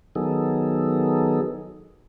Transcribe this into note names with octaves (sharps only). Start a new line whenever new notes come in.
D#3 F#3 B3 D#4 G#4 A4